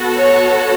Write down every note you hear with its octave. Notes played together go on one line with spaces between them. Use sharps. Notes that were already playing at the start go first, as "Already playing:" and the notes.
Already playing: B3 F#4 A4
C#5